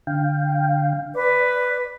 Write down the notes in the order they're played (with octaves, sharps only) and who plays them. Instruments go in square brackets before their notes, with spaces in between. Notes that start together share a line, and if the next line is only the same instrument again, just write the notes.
[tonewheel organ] D3 F5 G5
[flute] B4 [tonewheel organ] D5